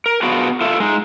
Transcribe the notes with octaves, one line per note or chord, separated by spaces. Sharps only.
A#4
B3 D4 F4 F#4 G#4
F4 A4 E5
G#3 D#4